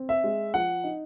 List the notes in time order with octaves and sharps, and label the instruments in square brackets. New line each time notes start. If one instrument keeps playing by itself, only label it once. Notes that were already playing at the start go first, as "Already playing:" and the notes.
Already playing: [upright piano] C4
[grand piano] E5
[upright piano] G#3
[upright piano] F3 [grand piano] F#5
[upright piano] D#4